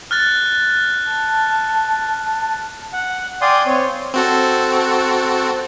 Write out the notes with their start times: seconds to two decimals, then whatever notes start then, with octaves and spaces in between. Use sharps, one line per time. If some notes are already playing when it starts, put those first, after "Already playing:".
0.11 F6 F#6 A6
1.05 A5
2.93 F#5
3.41 D5 F5 G5 G#5 C6 D#6
3.66 C4 C#5
4.14 C4 F#4 A4